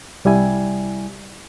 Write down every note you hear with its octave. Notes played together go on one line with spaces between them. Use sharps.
C2 G3 E4 G#5